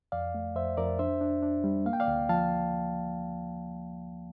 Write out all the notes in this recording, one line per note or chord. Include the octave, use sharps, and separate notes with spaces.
F2 D5 F5
A3
F2 C5 E5
F2 A#4 D5
D4 C5 E5
D4
D4
G3
A#3 F5
G5
D5 F5
D2
F3 F5 A5